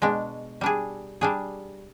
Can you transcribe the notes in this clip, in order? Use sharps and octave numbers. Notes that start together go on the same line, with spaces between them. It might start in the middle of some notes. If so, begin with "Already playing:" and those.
B2 G#3 D4
G3 D4 G#4
G3 D4 G#4